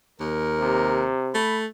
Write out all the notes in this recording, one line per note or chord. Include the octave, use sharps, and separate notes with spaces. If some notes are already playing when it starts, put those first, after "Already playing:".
D#2 A#4
C3
A3 B5